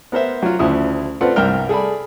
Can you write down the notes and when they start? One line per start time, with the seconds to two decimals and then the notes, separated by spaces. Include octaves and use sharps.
0.12 B3 A#4 C5 E5
0.43 F#3 F4
0.59 D2 C#3 F3 E4 D#6
1.21 A3 C4 F4 B4 D5 F#5
1.36 C2 G2 A#4 E5 G5 F6
1.69 G#4 A4 D5 B5